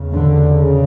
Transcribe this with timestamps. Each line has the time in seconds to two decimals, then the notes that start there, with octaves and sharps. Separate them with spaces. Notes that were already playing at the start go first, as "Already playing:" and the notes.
Already playing: E2 C#3
0.12 D3
0.53 C#3